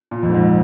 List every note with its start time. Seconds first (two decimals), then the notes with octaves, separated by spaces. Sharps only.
0.11 A#2
0.23 F2
0.29 G#2
0.34 F2